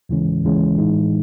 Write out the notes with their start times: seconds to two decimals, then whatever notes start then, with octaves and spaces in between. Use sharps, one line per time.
0.09 D#2 C#3 E3 G#3 C#4
0.44 D#2 C#3 E3 G#3 C#4
0.78 A2 E3 G#3 D#4